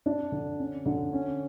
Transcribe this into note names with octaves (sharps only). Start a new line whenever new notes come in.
D4
D3
C#4
D3
C#4